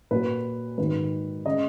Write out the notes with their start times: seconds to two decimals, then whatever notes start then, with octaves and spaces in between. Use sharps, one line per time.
0.11 A#2 F#3 B4
0.78 G#2 D#3 F#3 B4
1.46 C#3 G#3 D#5